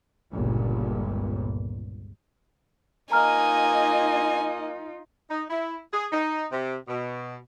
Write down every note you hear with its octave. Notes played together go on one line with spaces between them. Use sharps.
G1 C#2 A#2
A#3 D#4 F4 D#5 G#5 A#5 F6
D#4
E4
G#4
D#4
C3
B2